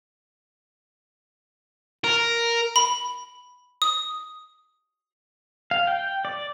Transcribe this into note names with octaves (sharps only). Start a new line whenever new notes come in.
A#4
B5
D#6
F5
G5
D5